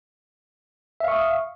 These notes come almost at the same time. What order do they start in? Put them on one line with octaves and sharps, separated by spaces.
E5 F5 C#6 D#6